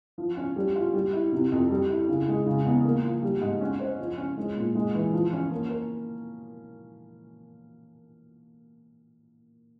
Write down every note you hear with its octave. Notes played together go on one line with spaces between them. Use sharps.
F3
C#4
G3
F4
G3
E4
C3
F2
G3
E4
C#3
G#3
C#3
E2
A#3
F3
G3
G#2
C#4
C5
F3
C#4
G#3
A#2
G#3
E3
F3
C#4
A#3
A#4